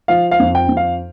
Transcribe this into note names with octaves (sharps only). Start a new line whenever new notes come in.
F3 F5
F5
F2
G5
F2
F5